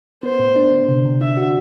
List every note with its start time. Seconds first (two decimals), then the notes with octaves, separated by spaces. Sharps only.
0.23 B3 C5
0.39 A2
0.56 D4
0.72 D3
0.88 C3
1.05 C3
1.21 D4 E5
1.37 F#4